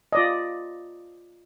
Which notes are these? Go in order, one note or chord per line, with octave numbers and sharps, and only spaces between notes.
F4 D5 D#5